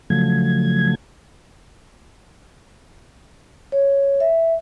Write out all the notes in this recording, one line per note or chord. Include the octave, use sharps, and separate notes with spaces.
C#3 F3 F#3 A3 G#6
C#5
E5